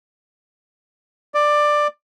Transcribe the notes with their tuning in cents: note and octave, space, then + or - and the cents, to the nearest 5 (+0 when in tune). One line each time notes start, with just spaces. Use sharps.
D5 +15